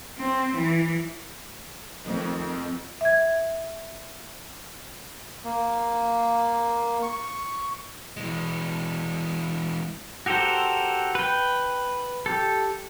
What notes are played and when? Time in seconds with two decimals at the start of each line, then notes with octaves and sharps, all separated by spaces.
0.18 C4
0.55 E3
2.06 F2 D#3 F3 A3 C4 D#5
3.01 E5 G#6
5.45 A#3
7.03 C#6
8.17 E3 G#3
10.26 F#4 G4 A4 A#4 C5
11.15 B4 G5
12.26 G4 A4